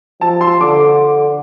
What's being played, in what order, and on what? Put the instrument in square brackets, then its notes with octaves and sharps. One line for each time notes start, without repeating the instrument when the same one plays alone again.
[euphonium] F3 [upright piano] A5
[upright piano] C6
[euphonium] D3 [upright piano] D6